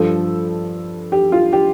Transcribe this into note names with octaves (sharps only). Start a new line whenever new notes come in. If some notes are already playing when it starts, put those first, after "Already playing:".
Already playing: G2 F3 A4
G4
F4
G4